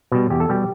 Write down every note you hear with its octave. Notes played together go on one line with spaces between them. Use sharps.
B2 G3
E2 G4
A4
B2 G3 G4